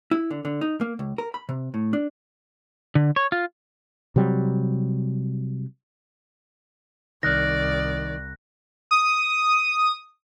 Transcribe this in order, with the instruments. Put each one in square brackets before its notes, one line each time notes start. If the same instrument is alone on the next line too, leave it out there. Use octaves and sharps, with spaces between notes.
[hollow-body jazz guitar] E4
D3
D3
D#4
A#3
C#2
A#4
B5
C3
A2
D4
[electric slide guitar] D3
C#5
F4
[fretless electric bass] C3 F#3 G3
[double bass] C2 [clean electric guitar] D#3 [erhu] D5 [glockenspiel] F#6 A#6
[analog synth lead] D#6